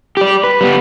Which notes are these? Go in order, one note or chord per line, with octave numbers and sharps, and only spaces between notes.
G4 D5
B4
G3 B3